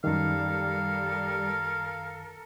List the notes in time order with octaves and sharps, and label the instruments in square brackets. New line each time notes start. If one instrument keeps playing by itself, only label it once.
[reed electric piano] F#2 D#3 [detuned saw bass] G3 [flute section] A4 A#4 [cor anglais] F5